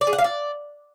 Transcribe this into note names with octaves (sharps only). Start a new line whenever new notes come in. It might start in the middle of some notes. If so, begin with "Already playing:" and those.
D5
G#4
F#5
F5
D5